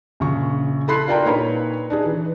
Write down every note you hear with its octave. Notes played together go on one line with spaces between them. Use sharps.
A#1 C#3 C#6
E4 A4 B5 C6 F#6 C7
D4 F4 A#4 D5 G5 A#5
A#2 D#4 B4 C#5 B5
D4 D#4 G#4
E3